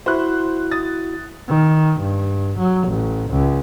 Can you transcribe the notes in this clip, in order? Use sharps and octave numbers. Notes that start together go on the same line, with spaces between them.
E4 F#4 C5 F#6
D#6 A6
D#3
G2
F#3
A1
C#2